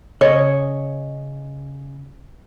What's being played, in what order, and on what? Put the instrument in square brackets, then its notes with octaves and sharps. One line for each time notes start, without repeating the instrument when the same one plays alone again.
[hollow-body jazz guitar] C#3 D#5 [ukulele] C#5